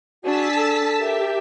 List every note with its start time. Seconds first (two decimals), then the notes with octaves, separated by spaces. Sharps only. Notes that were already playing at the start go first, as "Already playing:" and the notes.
0.24 D4 F#4 G#4 A5 E6 B6
0.56 A4
0.97 G4 A#4 E5